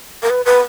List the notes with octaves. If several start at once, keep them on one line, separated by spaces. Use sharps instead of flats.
A#4
B4
B4